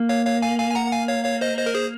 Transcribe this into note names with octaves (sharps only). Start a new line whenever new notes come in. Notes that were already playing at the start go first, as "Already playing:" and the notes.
Already playing: A#3
C#5 F5
C#5 F5
F5 G#5
F5 G#5
G#5
F#5 A#5
F#5
F5 G#5
C#5 F5
C#5 F5
C5 D#5
C5 D#5
A#4
G#4 C5